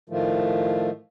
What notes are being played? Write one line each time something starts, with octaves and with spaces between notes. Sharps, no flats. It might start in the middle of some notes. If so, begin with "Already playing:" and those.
A2 D#3 F3 A3